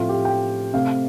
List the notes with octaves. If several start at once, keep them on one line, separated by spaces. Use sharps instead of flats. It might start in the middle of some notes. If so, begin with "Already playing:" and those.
Already playing: A2 F3 A3 C4 F4
G4
G5
C3 A3 C4 F5